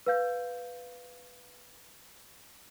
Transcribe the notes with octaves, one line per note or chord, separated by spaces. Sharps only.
B4 F5 G6